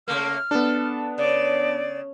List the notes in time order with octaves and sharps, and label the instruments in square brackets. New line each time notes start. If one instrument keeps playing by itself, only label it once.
[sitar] C#3 A3 A#3 [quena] F6
[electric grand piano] B3 D4 [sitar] A4
[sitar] C#3 [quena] D5